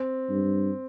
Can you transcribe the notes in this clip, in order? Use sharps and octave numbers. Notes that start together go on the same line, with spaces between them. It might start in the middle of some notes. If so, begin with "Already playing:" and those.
Already playing: C4
G2